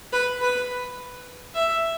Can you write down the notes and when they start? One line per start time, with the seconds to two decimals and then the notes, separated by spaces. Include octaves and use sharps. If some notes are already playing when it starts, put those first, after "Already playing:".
0.13 B4
0.41 B4
1.54 E5